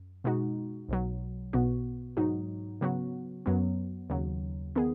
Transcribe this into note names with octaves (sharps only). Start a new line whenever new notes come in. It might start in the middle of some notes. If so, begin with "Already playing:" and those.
Already playing: F#2
B2 G#3 D#4 F#4
B1 B2 F#3
B1 B2 B3 F#4
G#2 F#3 D#4 F#4
C#3 F#3 B3 F#4
F#2 F#3 B3
D#2 C#3 F#3
D#3 B3 G#4